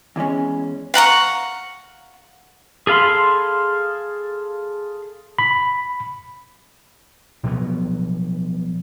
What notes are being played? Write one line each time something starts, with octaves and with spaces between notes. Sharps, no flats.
E2 E3 G#3 C#4
F5 F#5 A#5 C#6
G#4 A4 F5 B5 C6
B5
B2 F3 F#3 B3